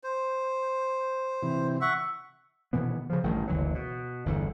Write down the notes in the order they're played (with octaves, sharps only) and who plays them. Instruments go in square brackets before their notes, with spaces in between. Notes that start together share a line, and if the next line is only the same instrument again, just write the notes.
[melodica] C5
[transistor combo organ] C3 E3
[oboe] E5 [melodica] F#5 C#6
[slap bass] B2 D#3 E3 B3
C#3 F3
A1 G2 D#3
F#1 D2 E3 F#3
B2
G1 E2 D3